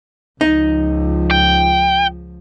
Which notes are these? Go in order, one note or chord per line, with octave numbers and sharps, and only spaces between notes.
C#2 F3 D#4
G5